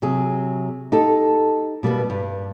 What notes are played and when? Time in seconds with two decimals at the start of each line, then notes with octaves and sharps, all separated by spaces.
0.02 C3 F#3 G#4
0.92 D#4 G4 A4
1.83 B2 G3 A#3 B3
2.10 G2